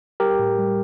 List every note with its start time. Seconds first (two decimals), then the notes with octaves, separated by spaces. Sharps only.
0.20 G3 G4 A#4
0.39 A2
0.58 G3